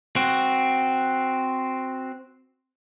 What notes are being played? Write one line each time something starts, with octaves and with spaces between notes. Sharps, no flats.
C4 F#4